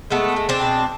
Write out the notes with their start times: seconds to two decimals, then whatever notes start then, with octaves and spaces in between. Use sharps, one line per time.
0.11 G#3 A3 B3
0.36 G#3
0.49 C4 D4
0.62 B2